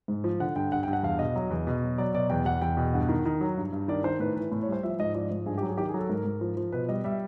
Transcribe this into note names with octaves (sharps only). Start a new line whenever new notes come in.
G#2
F3
D3 F#5
G2 G5
G2 F#5
G5
G2
F#5
E2 F5
B2 D#5
F#3
E2
B2
F#3
F#3 D5
B2 D5
E2 G5
E2 F#5
E2 G5
B2
G2 F#5
D#3
D#3
F#3
G2
G2
D#3 D5
D#3 C5
A2 B4
E3 B4
A2
C#5
G3 C5
F3 E5
G#2 D#5
F3 D5
G#2
G2 G#4
G4
F#3
G#4
D#3 G4
G#4
F#3 A4
G#2 A#4
G#2
F3
F3
B2 B4
G3 D#5
G3 E5